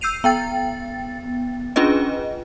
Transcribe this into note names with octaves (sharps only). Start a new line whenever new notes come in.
E6 G6 C7 D#7 F7
B3 G5 A6
C#4 D4 F4 G#4 B4 D#5